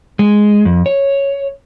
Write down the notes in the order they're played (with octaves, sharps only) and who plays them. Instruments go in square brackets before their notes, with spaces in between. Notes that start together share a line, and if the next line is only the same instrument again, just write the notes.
[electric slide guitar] G#3
F2
C#5